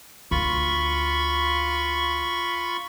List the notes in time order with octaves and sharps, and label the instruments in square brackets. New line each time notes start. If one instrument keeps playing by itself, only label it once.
[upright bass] D2 [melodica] F4 B5 C#6